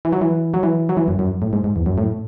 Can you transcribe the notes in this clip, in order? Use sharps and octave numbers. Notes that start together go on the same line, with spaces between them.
E3
F#3
E3
F#3
E3
F#3
E3
F#2
F#2
A2
G#2
G#2
E2
F#2
A2